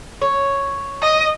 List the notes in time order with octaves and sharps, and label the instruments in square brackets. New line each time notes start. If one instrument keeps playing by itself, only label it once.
[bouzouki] C#5
[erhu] D#5